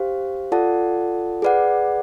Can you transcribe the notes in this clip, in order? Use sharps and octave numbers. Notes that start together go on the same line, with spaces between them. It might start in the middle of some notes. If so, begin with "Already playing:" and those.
Already playing: G4 C5 F5
F4 A4 D5 F#5 A5
G#4 B4 D5 F#5